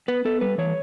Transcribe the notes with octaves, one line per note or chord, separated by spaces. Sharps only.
B3 B4
B3 A4
G3 B4
E3 C#5